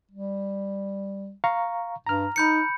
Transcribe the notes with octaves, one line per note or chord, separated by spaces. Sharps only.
G3
F5 A#5 C#6
G2 A#5 F6
D#4 B5 G6 C#7